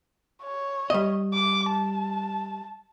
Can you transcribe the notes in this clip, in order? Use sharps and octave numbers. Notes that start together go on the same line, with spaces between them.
C#5
G3 D#5
D6
A5